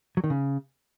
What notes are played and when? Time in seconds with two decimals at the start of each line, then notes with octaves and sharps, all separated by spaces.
0.17 F#3
0.24 D#3
0.30 C#3